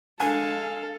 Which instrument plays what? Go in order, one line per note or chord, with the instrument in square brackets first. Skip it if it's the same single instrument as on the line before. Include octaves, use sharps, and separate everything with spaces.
[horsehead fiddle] G#3 F5 [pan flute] D4 [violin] A4 [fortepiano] G#5